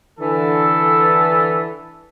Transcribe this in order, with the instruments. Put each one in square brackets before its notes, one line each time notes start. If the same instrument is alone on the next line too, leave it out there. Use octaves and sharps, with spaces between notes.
[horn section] D3 E3 A4